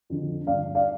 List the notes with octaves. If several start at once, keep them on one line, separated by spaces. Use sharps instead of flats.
F2 D3
G2 D3 D5 F5
D5 F5